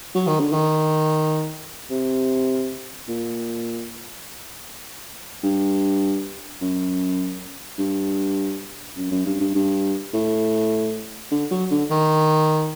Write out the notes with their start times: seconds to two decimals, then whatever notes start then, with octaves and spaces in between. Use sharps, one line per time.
0.15 F#3
0.27 D#3
0.40 D3
0.53 D#3
1.90 C3
3.09 A#2
5.43 G2
6.61 F#2
7.78 G2
8.97 F#2
9.11 F#2
9.26 G2
9.40 G2
9.55 G2
10.14 A2
11.31 D3
11.51 F#3
11.71 D3
11.91 D#3